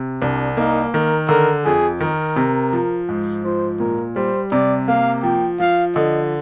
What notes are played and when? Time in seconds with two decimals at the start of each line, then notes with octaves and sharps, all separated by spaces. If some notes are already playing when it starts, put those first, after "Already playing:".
Already playing: C3
0.22 C2 D4
0.57 A#3 D#4
0.93 D#3 A#4
1.29 D3 A#4
1.65 F2 G#4
2.01 D#3 A#4
2.36 C3
2.73 F3
3.09 G#2
3.44 F3 C5
3.80 A#2 A#4
4.16 G3 C5
4.52 C3 D5
4.88 A#3 F5
5.23 F3 G5
5.60 F3 F5
5.95 D3 D#5